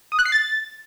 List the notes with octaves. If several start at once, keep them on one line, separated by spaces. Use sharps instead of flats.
D#6
F#6
C7
A6